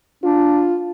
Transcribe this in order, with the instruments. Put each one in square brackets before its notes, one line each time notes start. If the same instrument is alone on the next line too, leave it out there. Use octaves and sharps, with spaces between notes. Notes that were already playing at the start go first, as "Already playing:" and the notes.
[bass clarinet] D4 [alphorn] F4